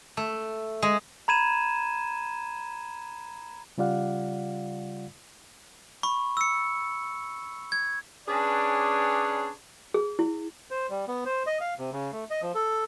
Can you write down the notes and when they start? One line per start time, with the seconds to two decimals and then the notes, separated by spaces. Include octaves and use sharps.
0.17 A3
0.82 G#3
1.28 A#5 B5 G#6 D#7 E7
3.78 C#3 G3 F4 D5 F5 F#5
6.03 B5 C#6
6.37 E6 C#7
7.72 G#6
8.28 C#4 D4 G#4 B4 C#5 D5
9.94 G#4
10.19 E4
10.71 C5
10.90 G3
11.08 B3
11.26 C5
11.47 D#5
11.61 F5
11.79 C3
11.93 C#3
12.12 A3
12.30 D#5
12.42 F3
12.55 A4